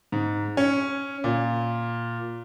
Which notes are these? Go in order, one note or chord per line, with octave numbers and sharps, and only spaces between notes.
G#2
C#4
A#2